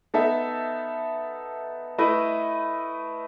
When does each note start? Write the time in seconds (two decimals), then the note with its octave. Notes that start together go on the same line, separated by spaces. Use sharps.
0.14 B3 D#4 A4 E5
1.98 A3 E4 B4 D#5